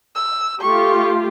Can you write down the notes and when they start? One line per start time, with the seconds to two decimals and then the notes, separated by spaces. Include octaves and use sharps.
0.15 E6
0.61 A3 F4 G4 C#6